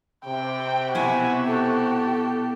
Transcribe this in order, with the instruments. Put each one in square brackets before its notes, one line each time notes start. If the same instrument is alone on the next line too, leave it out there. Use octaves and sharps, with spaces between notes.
[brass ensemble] C3 [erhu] G5
[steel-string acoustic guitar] B2 E4 [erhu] F#4 [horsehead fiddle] F#5 G#5
[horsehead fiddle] G4 A4